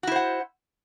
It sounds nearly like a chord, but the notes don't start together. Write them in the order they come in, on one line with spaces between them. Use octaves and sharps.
F#4 E4 C5 F#5